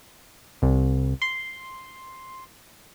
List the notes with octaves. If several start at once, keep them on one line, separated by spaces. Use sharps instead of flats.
C2
C6